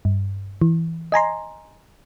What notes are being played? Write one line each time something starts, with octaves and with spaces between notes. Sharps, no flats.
G2
E3
D#5 G#5 A#5 C6